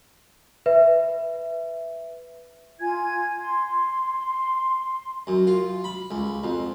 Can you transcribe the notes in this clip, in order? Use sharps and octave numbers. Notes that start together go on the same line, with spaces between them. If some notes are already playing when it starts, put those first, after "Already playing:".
B4 E5
F4 G#5 G#6
C6
F#2
F4
B5
C#2
F2